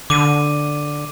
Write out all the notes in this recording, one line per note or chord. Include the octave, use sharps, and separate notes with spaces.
D3 D6 D#7